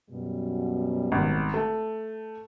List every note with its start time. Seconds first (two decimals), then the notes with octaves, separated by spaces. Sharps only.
0.10 F#2 B2 G3
1.12 G#1
1.54 A3